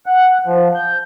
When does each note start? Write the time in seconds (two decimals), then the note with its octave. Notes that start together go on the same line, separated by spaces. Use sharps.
0.06 F#5
0.46 F3
0.75 G6